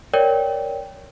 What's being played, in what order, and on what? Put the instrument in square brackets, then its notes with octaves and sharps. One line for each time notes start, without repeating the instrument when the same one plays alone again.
[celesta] A#4 C#5 D5 G5